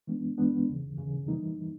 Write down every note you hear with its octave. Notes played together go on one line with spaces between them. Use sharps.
E3 G#3 B3 D4
E3 G#3 B3 D4
D#2 C#3 E3
D#2 C#3 E3
E3 G3 A#3 D#4